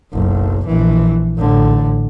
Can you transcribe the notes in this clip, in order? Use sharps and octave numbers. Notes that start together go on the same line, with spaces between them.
F#1 B1
A#1 E3
A1 D3